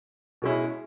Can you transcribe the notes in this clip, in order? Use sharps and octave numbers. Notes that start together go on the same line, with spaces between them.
B2 G#3 C#4 E4